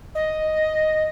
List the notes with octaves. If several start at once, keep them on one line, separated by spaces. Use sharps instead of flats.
D#5